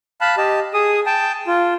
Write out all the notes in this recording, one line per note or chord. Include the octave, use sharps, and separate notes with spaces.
F5 A5 B5 F#6
G4 D#5 A5
G#4 D#6
G5 A5
F4